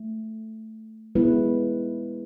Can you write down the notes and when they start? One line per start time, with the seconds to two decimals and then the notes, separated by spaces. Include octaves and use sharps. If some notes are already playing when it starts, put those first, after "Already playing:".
Already playing: A3
1.15 G#3 B3 E4 B4